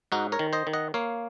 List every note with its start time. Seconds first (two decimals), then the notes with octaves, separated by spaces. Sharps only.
0.12 G#2 D#4 F#4
0.32 A#4 C#5
0.39 D#3
0.53 C5 D#5
0.67 D#3
0.73 D#5 F#5
0.94 A#3 C#5 F5